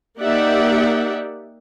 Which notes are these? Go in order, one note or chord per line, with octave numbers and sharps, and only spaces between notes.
A#3 D#4 G4 D5 E5 F#5